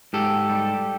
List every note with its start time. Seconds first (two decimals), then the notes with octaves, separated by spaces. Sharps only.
0.13 G#2 G4 A4
0.50 G3